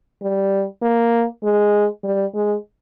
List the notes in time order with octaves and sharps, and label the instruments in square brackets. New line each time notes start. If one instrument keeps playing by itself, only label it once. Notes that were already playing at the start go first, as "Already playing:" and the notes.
[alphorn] G3
A#3
G#3
G3
G#3